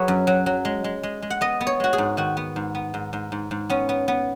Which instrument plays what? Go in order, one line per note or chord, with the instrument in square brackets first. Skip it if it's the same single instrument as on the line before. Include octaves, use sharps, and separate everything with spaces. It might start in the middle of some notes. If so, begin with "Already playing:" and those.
Already playing: [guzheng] F#3 G#4 B4 C#5
F#2
F#3
F#3
G#3
G#3
G#3
G#3
F#5
B3 D#5
B3
C#5
G#3 F#4
G#4
G#2
D#3 F#4
B3
G#2
B3
G#2
G#2
G#2
G#2
B3 C#4
B3
B3